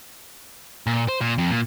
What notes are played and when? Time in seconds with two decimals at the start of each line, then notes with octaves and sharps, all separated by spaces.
0.87 A#2
1.08 C5
1.21 A#2
1.38 F2
1.51 A#2